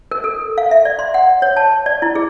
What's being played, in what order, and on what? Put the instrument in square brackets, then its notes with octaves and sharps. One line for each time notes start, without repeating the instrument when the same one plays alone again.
[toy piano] A#4
A4
F5
E5
D5
C6
F#5
C#5
A5
D5
E4
G#4